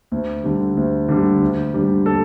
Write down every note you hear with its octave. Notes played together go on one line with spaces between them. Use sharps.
D2
D3 G3
D2
D3 G3
D2
D3 G3
A4